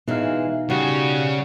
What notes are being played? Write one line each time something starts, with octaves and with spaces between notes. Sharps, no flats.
B2 E3 G#3 D#4 F5
C#3 G3 F#4